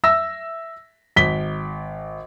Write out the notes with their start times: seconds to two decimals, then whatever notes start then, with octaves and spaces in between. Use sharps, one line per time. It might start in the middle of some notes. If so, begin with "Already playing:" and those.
0.04 E5 E6 A#6
1.16 G#1 B6 G7